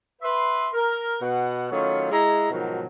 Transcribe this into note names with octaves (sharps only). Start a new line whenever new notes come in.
B4 E5 C6
A#4
B2 F#5
D#3 F#3 A3 C#4 F4 C#5
G#3 E4 A#5
G#2 B2 D#3 F3 F#3